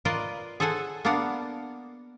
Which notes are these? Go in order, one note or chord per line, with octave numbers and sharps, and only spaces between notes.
F4 A#4 B4 D5 D#5
G#4 A4 C5 F#5 G#5
A#3 B3 D4 F5 F#5